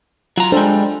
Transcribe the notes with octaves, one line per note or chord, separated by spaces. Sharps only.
F#3 F4 A#5
G3 G#3 D4 A4 C5